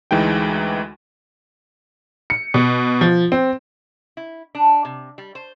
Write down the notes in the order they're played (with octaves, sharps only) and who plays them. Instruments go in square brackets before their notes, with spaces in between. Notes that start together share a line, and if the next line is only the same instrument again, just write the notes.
[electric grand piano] D2 E3 G#3 D#4 G5
[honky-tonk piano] C#7
B2
F3
C4
[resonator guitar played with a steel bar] E4
D4
C3
G3
C5